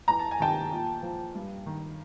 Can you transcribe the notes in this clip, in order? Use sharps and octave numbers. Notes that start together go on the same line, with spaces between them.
E2 A#5
A5
G#5
C3 D#3 G5 A5
A#2
F3
G2
D#3